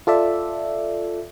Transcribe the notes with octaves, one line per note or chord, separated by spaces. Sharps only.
F4 A4 D5 E5